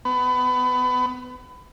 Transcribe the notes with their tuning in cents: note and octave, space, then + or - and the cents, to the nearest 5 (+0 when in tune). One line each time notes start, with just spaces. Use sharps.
B3 +25